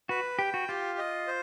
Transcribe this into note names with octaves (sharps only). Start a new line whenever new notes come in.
F#4 B4
G4 G5
F#4
F4 G4
D#5
C5